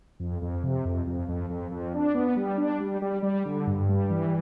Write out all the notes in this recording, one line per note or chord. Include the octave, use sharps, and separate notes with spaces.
F2
F2
C3
F2
F2
F2
F2
F2
D4
B3
G3
D4
G3
G3
G3
D3
G2
G3
E3